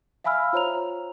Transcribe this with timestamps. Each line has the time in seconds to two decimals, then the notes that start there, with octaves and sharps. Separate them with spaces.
0.24 E5 F5 G#5 B5 E6 F6
0.53 F4 C5 C#5 A#5 F7